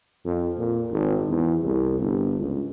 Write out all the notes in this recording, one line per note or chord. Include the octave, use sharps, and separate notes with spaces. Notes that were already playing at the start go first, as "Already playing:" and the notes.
F2
A#2
G#1
E2
C2
G1
C#2